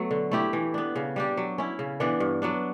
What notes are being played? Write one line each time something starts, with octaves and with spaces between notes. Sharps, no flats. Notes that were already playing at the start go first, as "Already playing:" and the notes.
Already playing: F#3 A3 B3
D3
A3 E4 G4
E3
B3 D4
C#3
G3 D4 G4
F#3
C#4 E4
C#3
E3 B3 D4
G2
F#3 B3 D4